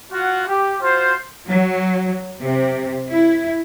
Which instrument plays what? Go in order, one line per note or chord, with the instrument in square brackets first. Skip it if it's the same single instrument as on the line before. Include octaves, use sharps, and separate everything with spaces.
[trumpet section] F4 F#4 F#5
G4
F4 F#4 C5
[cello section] F#3
C3
E4